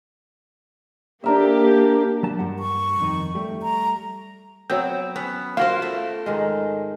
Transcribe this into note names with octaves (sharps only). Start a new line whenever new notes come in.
A#3 D4 G4 A#4 E5
F#3 A5
G2 A#4 F#5
C#6
F2 D#3 D#4
G3 A3
A#5
F#3 B3 C4 C#5 G6
B3 C#4
A#3 F4 F#4 C5 F5
A3
G#2 D#3 G#3